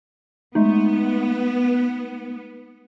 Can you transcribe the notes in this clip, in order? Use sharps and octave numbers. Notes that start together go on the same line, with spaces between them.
G#3 A3 B3 D#4